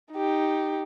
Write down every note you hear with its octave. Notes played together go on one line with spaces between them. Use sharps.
D#4 G4